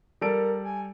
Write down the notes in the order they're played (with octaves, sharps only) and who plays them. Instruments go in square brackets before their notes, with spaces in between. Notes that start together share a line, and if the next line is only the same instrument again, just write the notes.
[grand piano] G3 A4 D7 [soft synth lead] A#4
[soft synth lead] G#5